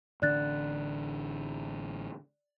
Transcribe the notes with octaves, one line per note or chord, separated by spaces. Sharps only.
A1 D3 D4 D5 F#6 A6